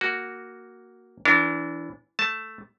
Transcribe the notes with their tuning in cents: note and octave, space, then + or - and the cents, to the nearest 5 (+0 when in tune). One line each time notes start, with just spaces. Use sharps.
A#3 -5 F#4 +0
E3 +5 D4 -25 A#4 -35
A3 +0 A5 +0